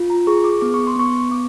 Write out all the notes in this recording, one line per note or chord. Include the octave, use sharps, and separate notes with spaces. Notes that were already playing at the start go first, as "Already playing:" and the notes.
Already playing: F4
A#5
G#4 C#6
D6
B3 D6
C#6
C6
B3 C#6
B3 D6